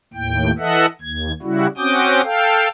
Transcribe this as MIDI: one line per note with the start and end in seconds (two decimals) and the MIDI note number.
0.14 0.51 39
0.14 0.51 45
0.14 0.51 79
0.58 0.86 52
0.58 0.86 69
0.58 0.86 75
0.58 0.86 76
0.58 0.86 78
1.01 1.32 39
1.01 1.32 92
1.42 1.67 49
1.42 1.67 55
1.42 1.67 64
1.42 1.67 66
1.78 2.21 60
1.78 2.21 61
1.78 2.21 66
1.78 2.21 86
1.78 2.21 87
1.78 2.21 91
2.24 2.68 69
2.24 2.68 77
2.24 2.68 79